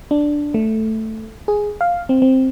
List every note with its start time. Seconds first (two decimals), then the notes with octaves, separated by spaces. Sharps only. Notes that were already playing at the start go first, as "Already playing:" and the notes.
0.11 D4
0.54 A3
1.48 G#4
1.81 F5
2.09 C4
2.22 C4